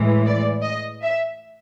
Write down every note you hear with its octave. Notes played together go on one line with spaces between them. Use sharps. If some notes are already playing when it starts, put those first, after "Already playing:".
Already playing: A2 E3 G#3
D5
D#5
E5